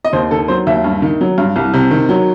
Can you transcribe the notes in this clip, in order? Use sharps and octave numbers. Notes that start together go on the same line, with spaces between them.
D#5
D#2 C5
D#3 A4
F#3 C5
D#2 E5
G2
D#3
F#3
G2
C2
C3
D#3
F#3